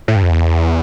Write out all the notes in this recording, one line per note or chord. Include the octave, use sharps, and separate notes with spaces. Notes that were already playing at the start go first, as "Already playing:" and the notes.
A2
G2
F2
E2